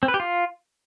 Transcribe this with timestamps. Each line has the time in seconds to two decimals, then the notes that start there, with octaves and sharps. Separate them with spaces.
0.03 C4
0.08 B4
0.14 G4
0.20 F4